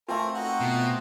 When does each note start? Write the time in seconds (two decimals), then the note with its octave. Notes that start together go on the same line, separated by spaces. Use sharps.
0.09 A3 C4 F4 A#4 G5 G#5
0.35 D#4 F#4 F#5
0.60 B2